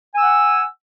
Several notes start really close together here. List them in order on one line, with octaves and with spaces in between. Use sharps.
G#5 E6 F#5